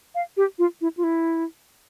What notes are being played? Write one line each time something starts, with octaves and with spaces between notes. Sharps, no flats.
F5
G4
F4
E4
F4
E4